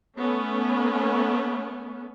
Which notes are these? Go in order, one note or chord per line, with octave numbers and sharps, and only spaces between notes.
A3 B3 C#4